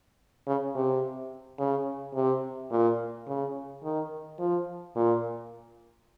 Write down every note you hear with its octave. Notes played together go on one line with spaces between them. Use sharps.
C#3
C3
C#3
C3
A#2
C#3
D#3
F3
A#2